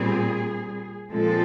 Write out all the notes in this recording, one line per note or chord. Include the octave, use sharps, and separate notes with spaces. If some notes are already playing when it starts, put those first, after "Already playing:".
Already playing: A#2 G3 C4 G#4
A#2 F3 G#3 C4 A4